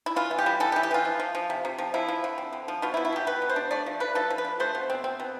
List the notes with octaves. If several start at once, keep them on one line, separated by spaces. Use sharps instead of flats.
E4
E3 F4
E3
G4
G3
E3 A4
G4
E3
G4
E3 F4
F3
F3
F3
C3
C3
F3
F3 E4
F3
D3
C4
D3
F3
B2 F4
E4
B2
E4
B2 G4
B2 B4
B2
C5
D4
A3 D5
F3
A3 B4
F3 A4
F3
B4
D4
A3 C5
B2
C4
C4
B2